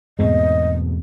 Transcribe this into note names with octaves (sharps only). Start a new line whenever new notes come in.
E2 G#2 B2 A3 C4 D#5